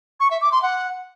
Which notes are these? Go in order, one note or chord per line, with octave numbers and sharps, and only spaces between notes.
C#6
E5
D6
C6
F#5